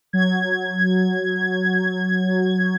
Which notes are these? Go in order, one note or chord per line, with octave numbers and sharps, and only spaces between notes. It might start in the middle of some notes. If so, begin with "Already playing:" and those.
F#3 G#6